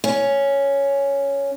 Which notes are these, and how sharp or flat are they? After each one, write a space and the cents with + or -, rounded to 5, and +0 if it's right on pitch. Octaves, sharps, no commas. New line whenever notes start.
C#4 +5